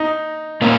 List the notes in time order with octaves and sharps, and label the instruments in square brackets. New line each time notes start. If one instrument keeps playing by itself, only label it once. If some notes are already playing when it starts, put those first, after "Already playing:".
Already playing: [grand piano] D#4
[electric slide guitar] A#2 A#3 C#4